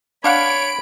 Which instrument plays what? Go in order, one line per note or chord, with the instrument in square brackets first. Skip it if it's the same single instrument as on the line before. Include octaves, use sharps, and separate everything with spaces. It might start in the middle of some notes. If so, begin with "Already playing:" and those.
[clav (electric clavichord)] D4 F5 F#5 [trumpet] C#5 [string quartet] B5 [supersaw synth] D7